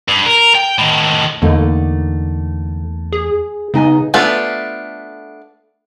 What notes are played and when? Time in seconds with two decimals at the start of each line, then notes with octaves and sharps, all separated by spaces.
0.08 G2
0.26 A#4
0.55 G5
0.78 A2 D#3
1.42 E2 D3 A3 A#3 D#4
3.12 G#4
3.74 C#3 B3 D#4 G#5
4.14 A3 B3 D4 F4 A4